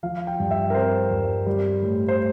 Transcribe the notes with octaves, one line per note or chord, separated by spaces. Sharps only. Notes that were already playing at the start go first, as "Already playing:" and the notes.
F3 F5
G5
G2
E5
A#4
C4 C5
G2
G3
A2
C5